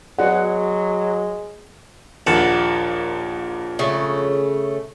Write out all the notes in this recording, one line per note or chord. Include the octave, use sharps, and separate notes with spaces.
F#3 G#3 F#4 B4 C#5 D5 F#5
A#1 D#2 A#3 F#5 A5
C#3 A3